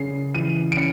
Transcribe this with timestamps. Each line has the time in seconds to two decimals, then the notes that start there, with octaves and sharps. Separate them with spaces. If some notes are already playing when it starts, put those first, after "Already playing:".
Already playing: C#3 C#4 C7
0.35 E3 D#7
0.72 D7
0.77 C#4 C#7